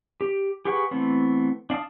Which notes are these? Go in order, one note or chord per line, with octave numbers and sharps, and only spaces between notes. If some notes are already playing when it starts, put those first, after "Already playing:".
G4
G4 G#4 B4 F#5 C#6
E3 A3 B3 C4
D4 F5 A5 D#6